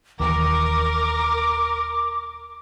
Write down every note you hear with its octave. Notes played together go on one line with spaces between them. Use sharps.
D#1 D#2 E3 A#4 D6